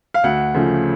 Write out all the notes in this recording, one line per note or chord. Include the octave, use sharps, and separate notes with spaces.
F5
D2 F#5
C#3 F3 A3